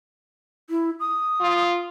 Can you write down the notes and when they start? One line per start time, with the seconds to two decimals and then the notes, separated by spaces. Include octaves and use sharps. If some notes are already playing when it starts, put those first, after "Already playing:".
0.70 E4
1.00 D#6
1.40 F4